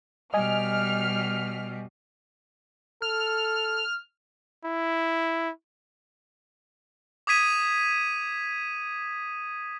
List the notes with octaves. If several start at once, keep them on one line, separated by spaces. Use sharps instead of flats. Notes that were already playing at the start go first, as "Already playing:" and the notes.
B2 G3 D#5 G#5 F6
A4 F6
E4
D6 D#6 G#6 B6 D#7